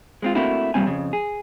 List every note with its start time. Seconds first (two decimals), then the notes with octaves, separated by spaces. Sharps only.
0.22 G#3 C4 F4
0.35 A3 A#3 C4 D4 E4 F#4
0.74 G2 A#2 G3 C4 G#5
0.86 F2 C#3
1.13 G#4